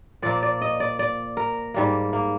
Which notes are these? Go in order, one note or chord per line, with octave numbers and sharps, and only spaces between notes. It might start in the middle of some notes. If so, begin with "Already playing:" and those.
A#2 F3 A#3 D5
D5
D#5
D5
D5
A#4
G#2 G3 A#3
A#3